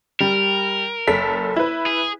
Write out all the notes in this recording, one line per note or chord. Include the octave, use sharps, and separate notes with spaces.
G3 A#4
F#1 A4 B6
E4 B4
G#4